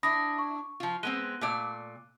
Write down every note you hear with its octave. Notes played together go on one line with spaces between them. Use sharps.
D4 E4 B5 D#6 A#6
C#6
F3 F4
G#3 B3 C4 F#6 D#7 G7
A#2 A3 D5